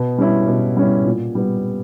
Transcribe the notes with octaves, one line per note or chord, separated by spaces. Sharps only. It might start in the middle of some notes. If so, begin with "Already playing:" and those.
Already playing: B2
G3 C#4 E4
B2
G3 C#4 E4
A#2
G3 B3